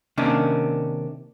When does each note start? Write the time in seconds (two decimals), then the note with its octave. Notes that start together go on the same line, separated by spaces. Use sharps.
0.17 C3 D#3 A#3 C#4 D4